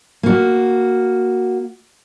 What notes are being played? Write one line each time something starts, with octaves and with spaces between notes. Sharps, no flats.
A#3 F#4